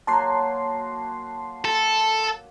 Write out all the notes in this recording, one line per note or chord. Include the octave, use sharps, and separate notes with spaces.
F#3 A#3 F#4 A5 C6 C7
A4